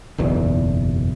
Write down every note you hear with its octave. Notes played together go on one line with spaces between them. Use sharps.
F#1 B1 E2